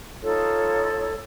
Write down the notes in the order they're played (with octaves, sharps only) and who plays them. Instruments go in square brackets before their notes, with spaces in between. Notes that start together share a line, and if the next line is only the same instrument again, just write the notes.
[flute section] D#4 F4 A4 C#5